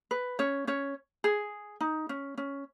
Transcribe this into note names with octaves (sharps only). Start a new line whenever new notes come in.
B4
C#4 C#5
C#4 C#5
G#4
D#4
C#4
C#4